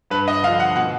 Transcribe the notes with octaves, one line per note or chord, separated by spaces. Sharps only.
G2 B4
D#5
D3 F3 F5
F#5
B2 F#5